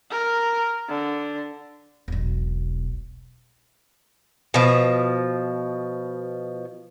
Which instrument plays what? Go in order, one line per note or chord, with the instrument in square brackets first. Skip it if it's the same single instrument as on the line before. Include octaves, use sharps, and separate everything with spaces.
[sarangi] A#4
D3
[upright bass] E1 B1
[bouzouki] B2 F3